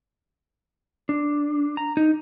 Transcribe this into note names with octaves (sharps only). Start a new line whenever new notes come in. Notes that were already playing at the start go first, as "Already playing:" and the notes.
D4
A#5
D#4